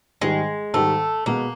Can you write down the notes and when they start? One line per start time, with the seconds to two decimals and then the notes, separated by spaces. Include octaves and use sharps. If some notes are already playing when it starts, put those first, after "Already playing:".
0.21 G#2 D#3 G3 G#3
0.74 G#2 D#3 G3 A3
1.26 B2 G#3 A#3 B3